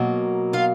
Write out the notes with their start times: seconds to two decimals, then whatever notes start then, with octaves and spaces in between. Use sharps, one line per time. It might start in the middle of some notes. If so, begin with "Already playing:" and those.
Already playing: B2 F#3 A#3
0.53 F4 F5